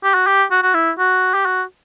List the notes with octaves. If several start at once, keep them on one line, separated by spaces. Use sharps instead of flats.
G4
F#4
G4
F#4
F#4
E4
F#4
G4
F#4